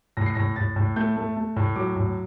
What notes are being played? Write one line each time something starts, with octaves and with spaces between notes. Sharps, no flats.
A2 A#6
C7
A2 A#6
A2 A6
A2
A3 G6
A3
A3
A2
F#3 D6
A2